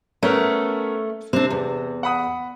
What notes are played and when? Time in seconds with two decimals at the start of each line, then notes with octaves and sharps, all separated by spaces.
0.23 A3 B3 C#4 A#4
1.33 C3 C4 D4
1.50 E2
2.03 F#5 B5 D#6